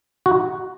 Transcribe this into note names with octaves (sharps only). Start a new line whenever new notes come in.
F#4